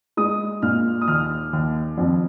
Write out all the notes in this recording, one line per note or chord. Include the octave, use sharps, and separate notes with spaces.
G#3 D#6
A#2 F6
D#6
D#2 F6
D#2
F2